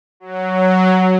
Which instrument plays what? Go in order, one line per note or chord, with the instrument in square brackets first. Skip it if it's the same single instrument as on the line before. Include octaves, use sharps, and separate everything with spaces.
[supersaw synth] F#3